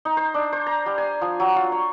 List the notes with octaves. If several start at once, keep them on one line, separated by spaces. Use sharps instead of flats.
D#4
C5
D4
C5
A#5
G3
G#5
F3
F#3
F4
C#5